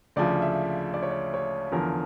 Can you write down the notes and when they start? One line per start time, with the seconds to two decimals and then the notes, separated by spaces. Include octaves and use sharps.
0.16 D2 C#3 F3 D5
0.42 E5
0.94 D5
1.03 C#5
1.11 D5
1.34 C#5
1.72 E2 D3 F3 A#4